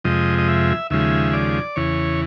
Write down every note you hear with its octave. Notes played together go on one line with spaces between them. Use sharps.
F2 C3 F3 G#3 D#5
D#5
E5
D#2 C#3 F3 G#3 E5
D5
E2 C#3 E3 C#5